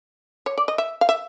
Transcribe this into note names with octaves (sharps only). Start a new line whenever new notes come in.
C#5
D5
D#5
E5
F5
E5